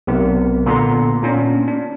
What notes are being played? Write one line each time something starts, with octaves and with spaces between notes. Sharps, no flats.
B1 C3 B3 A#4
A#2 D3 B3 A#5 C6
A#2 C#4 D4
D4